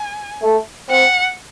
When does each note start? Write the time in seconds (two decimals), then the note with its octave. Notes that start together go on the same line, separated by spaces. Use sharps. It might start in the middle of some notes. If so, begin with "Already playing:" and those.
Already playing: G#5
0.42 A3
0.89 C4 F#5